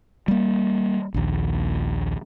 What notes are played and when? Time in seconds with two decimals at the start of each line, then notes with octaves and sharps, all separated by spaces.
0.28 G3 A#3
1.14 A#1 D#2